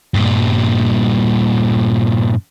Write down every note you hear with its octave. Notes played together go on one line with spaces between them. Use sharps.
G2 A#2